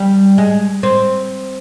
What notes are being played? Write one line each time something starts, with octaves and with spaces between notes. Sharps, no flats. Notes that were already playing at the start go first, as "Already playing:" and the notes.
Already playing: G3
G#3
C4